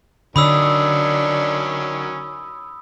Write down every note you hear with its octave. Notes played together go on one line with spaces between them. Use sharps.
D3 D#3 F#3 C#4 D4 B5 D#6 E6